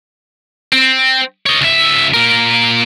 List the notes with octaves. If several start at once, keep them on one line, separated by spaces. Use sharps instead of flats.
C4
C#5 D#5
C#2 E5
A#2 A#4